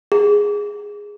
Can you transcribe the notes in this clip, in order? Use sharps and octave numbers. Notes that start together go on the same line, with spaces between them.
G#4